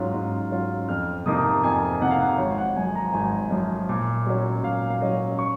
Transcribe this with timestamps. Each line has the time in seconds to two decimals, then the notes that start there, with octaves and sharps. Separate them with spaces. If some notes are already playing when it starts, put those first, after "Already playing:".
Already playing: G#2 F#3 C#4 F4
0.13 G#2
0.51 F#3 C#4 F4
0.89 F2 F6
1.26 C3 F3 A#3 D#4 D#6
1.63 F2 G#5
2.01 C3 F3 A#3 D#4 F#5
2.11 F5
2.20 F#5
2.38 G#1 C#5
2.58 F#5
2.76 F#2 F3 G#5
2.95 A#5
3.13 G#1 G#5
3.51 F#2 F3
3.89 A#2
4.26 F#3 C#4
4.63 A#2 F5
4.90 F5
5.01 F#3 C#4 D#5
5.39 C#6